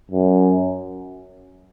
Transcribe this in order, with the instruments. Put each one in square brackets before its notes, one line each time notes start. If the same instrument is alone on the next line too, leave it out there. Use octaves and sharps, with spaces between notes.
[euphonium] F#2